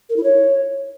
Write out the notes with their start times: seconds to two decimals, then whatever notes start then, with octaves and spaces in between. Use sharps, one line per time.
0.10 A#4
0.17 E4
0.24 C#5